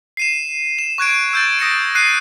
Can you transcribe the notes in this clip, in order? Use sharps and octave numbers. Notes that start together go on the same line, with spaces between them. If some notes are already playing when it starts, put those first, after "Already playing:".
C7 D#7 E7
E7
C#6 F#6 G#6 D7
E6 G6 A6
D#6 A#6 C#7 D7
F#6 C7 D#7